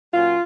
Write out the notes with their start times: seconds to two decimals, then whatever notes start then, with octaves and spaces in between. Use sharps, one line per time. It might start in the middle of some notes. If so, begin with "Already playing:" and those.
0.13 A#2 F#3 C#4 F4